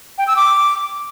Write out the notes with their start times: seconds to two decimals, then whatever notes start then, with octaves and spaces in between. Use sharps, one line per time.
0.18 G5
0.27 E6
0.36 D6